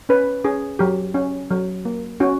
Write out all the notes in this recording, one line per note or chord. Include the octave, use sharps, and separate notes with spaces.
C#4 B4
C#4 G#4
F#3 G4
C#4
F#3
A#3
C#4 F#4